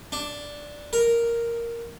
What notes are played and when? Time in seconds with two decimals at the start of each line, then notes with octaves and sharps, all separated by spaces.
0.12 D4
0.93 A#4